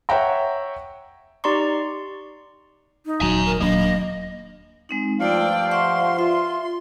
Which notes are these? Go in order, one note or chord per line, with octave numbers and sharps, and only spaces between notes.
C#5 E5 F#5 G5 A#5
D#4 G4 D5 A#5 C6 C#6
D#4
D#1 F#3 G#5 A#5
A#4
D#1 F#3 A#3 D4 D#5
G#3 C4 D#4
G2 F3 A3 D5 F5 G5 A5 E6
E5 F#5 C6 C#6
F4 E5